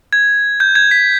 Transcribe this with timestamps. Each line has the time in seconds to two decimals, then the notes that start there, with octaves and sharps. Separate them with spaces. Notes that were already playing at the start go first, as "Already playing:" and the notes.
0.13 G#6
0.60 G6
0.75 G#6
0.91 B6